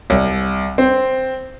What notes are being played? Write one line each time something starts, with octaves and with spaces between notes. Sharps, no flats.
C2
C4